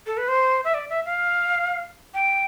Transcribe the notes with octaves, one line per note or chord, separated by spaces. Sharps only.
A4
B4
C5
E5
D5
E5
F5
G5